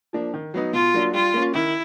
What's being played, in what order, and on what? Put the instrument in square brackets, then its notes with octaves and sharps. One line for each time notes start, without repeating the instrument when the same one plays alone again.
[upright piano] F3 A#3 D4
D#3
F#3 B3 D#4
[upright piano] B2 [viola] F4
[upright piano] F#3 A#3 D4
[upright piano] G3 [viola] F4
[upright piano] A#3 C#4
[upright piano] D#3 [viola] E4